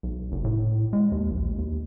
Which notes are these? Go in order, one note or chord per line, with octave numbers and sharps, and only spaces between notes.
B1
F#1
A2
G#3
D#2
A#1
D#2